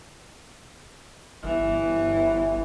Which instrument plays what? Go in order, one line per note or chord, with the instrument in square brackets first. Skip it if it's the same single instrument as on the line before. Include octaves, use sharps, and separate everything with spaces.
[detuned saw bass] G1 [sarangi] E3